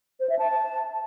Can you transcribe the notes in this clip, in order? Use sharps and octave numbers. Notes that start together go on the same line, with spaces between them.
C5
E5
A5